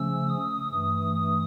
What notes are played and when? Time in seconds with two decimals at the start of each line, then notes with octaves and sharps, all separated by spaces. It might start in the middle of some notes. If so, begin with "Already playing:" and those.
Already playing: C#3 F3 A3 C#4 E6
0.28 D#6
0.71 G2 E3 A3 D#6
1.15 D#6